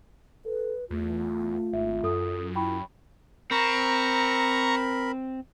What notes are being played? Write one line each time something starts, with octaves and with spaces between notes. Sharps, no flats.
A4 B4
E2 A3 F4
G#1 E5
F#2 A4 D#6
E4 G5 B5 C#6
C4 A#4 A#5 B5 C#6